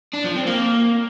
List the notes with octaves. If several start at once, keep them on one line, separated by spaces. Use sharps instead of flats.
D4
F3
C4
A#3